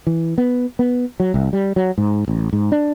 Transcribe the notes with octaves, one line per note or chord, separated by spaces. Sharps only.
E3
B3
B3
F#3
C2
G3
F#3
G#2
A1
G#2
D4